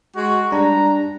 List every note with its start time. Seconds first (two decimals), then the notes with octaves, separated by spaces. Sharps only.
0.16 G#3 F#4
0.52 G3 D4 A#5